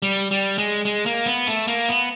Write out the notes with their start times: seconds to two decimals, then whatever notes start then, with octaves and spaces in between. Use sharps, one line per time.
0.02 G3
0.31 G3
0.58 G#3
0.85 G#3
1.06 A#3
1.26 B3
1.47 A3
1.68 A#3
1.89 B3